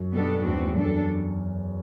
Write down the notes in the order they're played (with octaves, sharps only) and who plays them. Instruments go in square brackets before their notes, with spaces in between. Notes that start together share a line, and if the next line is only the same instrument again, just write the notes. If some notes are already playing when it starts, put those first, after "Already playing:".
Already playing: [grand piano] F#2
[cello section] B2 G3 B3 D4 A4
[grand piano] E2 [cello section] A2 G3 C4 F#4
[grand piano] E2
E2
[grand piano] F#2 [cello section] G3 D4 A4